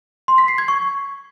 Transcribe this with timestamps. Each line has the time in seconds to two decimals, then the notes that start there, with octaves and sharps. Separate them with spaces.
0.28 C6
0.38 B6
0.48 C7
0.58 G#6
0.68 C#6